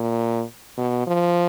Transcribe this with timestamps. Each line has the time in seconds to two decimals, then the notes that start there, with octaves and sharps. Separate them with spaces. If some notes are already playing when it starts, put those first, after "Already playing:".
Already playing: A#2
0.78 B2
1.07 F3